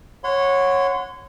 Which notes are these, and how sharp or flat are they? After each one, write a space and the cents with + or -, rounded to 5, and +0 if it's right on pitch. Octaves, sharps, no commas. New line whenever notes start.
C#5 -10 F#5 -15 C6 -35